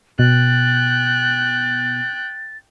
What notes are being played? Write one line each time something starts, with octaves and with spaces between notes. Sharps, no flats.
B2 G5 F#6 A6